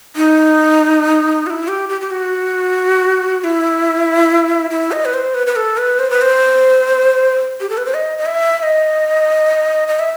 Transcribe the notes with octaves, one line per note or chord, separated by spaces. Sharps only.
D#4
F#4
E4
G4
G4
G4
F#4
F#4
E4
E4
D#5
B4
C5
B4
B4
A4
B4
C5
B4
C5
G4
A4
B4
C5
D#5
D#5
E5
E5
D#5
D#5
E5